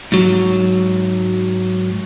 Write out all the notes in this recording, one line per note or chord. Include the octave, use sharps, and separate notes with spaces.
G#2 F#3